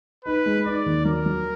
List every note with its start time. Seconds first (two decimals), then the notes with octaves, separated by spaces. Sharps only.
0.25 D#4 B4
0.46 G#3
0.66 D#4 D5
0.86 D#2
1.05 F#3 A#4
1.26 F#3